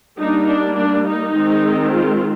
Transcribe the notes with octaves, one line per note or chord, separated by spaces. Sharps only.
G3 A#3 D4 D#4
D4
D4
D#4
D#3 G#3 C4
F4